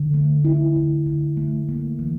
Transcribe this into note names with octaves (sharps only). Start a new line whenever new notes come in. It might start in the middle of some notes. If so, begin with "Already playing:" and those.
Already playing: D3
A3
E4
D3
D3
A3
A#3
E3